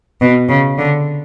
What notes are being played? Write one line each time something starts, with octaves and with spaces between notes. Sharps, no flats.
B2
C#3
D3